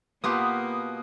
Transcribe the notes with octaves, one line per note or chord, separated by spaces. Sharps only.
B2 A#3 B3 F4 G4 B4 F5 D#6